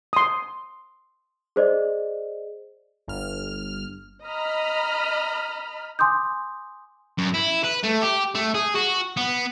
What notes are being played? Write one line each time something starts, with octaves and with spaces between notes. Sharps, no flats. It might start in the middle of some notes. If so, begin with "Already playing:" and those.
C6 D#6
G#4 C5 D5 D#5
G1 F6
D#5 A#5 B5 F6
G#5 C6 D6 D#6 G6
F#2
E4
B4
A3
G4
A3
G#4
F#4
B3